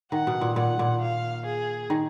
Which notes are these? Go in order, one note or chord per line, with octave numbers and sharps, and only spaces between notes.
D#3 F#5
B2
A#2
A#2 F#5
A#2
F5
G#4
D#3